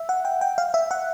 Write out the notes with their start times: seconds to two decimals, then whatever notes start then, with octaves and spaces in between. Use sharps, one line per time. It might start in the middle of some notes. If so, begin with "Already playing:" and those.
Already playing: E5
0.09 F#5
0.25 G5
0.41 G5
0.58 F5
0.74 E5
0.91 F#5